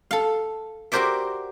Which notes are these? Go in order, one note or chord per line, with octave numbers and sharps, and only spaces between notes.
A4 F5
F#4 G4 A#4 C5 D5 E5